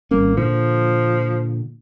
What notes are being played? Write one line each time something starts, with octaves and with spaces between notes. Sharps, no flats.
G#1 G3 A#3 C#4
A#2 D3 F3